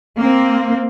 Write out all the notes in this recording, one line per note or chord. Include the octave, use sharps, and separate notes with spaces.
A#3 C4